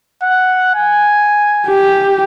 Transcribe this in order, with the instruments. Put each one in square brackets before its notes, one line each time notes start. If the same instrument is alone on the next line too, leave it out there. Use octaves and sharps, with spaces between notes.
[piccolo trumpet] F#5
G#5
[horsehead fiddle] G4